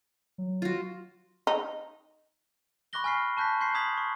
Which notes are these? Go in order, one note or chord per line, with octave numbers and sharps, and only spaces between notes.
F#3
F4 F#4
D#4
B5 C#6 D6 F#6 A#6 G7
G#5 B5 F6 B6 C7
A5 C#6 F#6 G6 A#6 B6
C6 C#6 G6 B6 C7
A#5 D#6 G#6 B6 C7 F#7
C#6